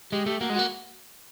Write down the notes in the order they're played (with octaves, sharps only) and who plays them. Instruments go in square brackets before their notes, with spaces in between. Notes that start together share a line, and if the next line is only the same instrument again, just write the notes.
[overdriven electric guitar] G#3 [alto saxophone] G4
[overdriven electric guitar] A3 [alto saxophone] G4
[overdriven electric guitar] A#3 [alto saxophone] F#4
[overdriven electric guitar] G#3
[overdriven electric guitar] A#3 [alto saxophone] F#4